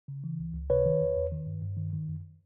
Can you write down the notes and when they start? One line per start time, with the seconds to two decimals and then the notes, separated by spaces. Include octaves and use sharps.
0.08 C#3
0.24 E3
0.39 C#2
0.54 C#2
0.70 C3 B4 C#5
0.86 D#3
1.01 E2
1.17 E2
1.32 D#3
1.47 G2
1.62 G2
1.77 D#3
1.93 D#3
2.08 F#2